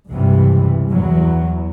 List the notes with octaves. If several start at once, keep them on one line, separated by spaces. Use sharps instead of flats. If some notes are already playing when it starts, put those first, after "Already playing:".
C#2 G2 C3 E3 G3
E2 F#3